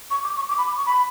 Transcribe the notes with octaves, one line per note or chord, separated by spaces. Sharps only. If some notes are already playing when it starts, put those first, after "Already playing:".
C#6
D6
C#6
D6
B5
D6
C#6
B5